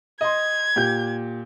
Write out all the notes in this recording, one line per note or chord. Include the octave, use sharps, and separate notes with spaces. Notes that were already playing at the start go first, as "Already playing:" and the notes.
D#5 C6 G#6
A#2 G4 G6